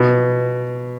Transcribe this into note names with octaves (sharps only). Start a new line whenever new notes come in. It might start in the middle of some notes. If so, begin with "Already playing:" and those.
Already playing: B2